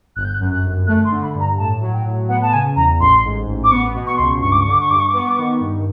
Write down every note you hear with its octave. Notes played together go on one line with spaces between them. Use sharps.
G1 F#6
G6
F#6
F#2
F#6
G1
A3 F#6
C6
D3
B5
G2
A#5
A2 A5
F#3
G5
A2
B3 F#5
A5
C#3 G#5
E2 A#5
A1 C6
G#2
A1
D6
B3 C#6
B2
C#6
C#2 C6
C#6
G2 C#6
D6
D3 C#6
D6
C#6
G2 D6
C#6
D6
B3
C#6
D6
D#3 C#6
G2